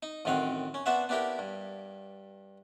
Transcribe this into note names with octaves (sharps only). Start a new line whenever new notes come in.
D#4
A1 F#2 D#3 C4 F5 F#5
C#4
B3 D4 F#4 C5 E5 F#5
B3 D4 E4 G4 A#4 G5
G2